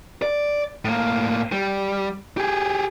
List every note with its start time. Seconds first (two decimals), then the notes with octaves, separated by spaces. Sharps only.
0.22 D5
0.85 A2 A#3
1.52 G3
2.38 G4 G#4